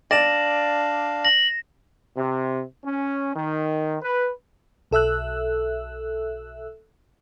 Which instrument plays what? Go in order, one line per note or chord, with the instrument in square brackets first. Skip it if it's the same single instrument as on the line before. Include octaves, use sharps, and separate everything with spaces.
[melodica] D4 F5 [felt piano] D5 [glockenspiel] A#6 E7 F#7
[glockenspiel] A#6 [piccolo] F#7
[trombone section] C3
C#4
D#3
B4
[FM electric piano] B1 A4 E5 E6 F#6